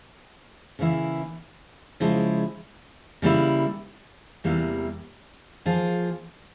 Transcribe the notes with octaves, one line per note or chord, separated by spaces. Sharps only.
C#3 E3 A#3 E4
C#3 F3 G#3 E4
C#3 G3 A#3 E4
E2 C3 G3 A#3 E4
F3 A#3 F4 G#4